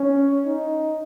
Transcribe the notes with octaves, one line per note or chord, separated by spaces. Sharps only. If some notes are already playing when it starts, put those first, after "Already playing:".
Already playing: C#4
D#4